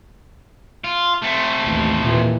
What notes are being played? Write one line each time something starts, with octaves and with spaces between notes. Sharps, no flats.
F4
A3 C4
A1 D#2
D#2 A#2 E3